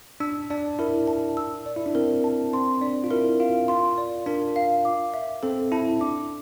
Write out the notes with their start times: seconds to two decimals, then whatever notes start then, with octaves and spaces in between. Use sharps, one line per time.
0.20 D4 E6
0.50 D4 D5
0.79 E4 A#4
1.07 A5
1.37 E6
1.66 D5
1.76 E4
1.86 D4
1.95 C4 A#4
2.24 A5
2.53 C4 C6
2.81 D4 D5
3.04 F4
3.11 E4 A#4
3.40 F4 F5
3.68 F4 C6
3.98 D5
4.26 D4 A#4
4.56 F5
4.85 D6
5.14 E5
5.43 C4 A4
5.72 E4 A5
6.01 D4 D6